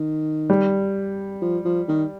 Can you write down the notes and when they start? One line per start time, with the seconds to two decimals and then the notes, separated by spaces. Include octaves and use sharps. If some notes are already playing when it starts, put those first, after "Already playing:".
Already playing: D#3
0.50 G3
1.42 F3
1.65 F3
1.89 D#3